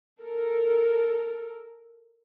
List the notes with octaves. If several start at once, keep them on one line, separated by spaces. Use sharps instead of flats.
A4 A#4